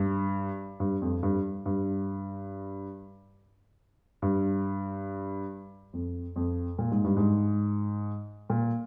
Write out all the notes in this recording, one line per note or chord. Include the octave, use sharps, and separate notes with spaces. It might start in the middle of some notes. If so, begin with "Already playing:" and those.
Already playing: G2
G2
F2
G2
G2
G2
F2
F2
A#2
G#2
G2
G#2
A#2